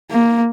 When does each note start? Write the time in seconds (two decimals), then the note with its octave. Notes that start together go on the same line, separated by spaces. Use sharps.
0.12 A#3